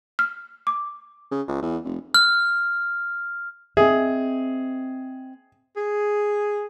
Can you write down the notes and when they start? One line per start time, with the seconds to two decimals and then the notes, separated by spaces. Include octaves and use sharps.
0.19 F6
0.67 D6
1.31 C#3
1.48 C#2
1.62 E2
1.85 F1
2.14 F6
3.77 C4 G#4 D#5 E5
5.77 G#4